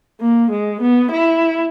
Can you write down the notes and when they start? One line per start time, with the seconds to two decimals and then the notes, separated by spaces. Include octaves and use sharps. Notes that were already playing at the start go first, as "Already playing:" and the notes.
0.21 A#3
0.51 G#3
0.82 B3
1.12 E4